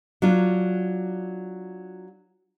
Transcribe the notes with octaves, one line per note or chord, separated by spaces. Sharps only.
F#3 D4 F4